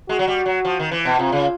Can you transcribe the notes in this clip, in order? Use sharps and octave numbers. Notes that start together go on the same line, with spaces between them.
G#3 F#4
F#3
G3
F#3
F3
D#3
E3
B2
C3 F4
C#3